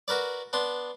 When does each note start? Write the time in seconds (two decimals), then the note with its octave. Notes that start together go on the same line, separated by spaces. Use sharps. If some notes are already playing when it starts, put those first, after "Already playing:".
0.08 F#4 A#4 B4 D5
0.53 B3 D4 C6